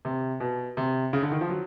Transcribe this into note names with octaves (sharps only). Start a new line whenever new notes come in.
C3
B2
C3
C#3
D3
D#3
F3
F#3